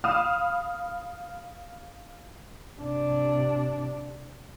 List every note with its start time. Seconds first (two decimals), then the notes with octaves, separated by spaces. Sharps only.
0.04 F5 B5 D#6 F6 D#7 E7
2.79 C3 D4